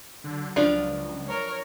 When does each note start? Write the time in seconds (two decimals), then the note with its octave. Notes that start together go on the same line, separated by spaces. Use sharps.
0.24 D3 F#3
0.56 C#2 F3 D4 F4
1.27 A#4 C#5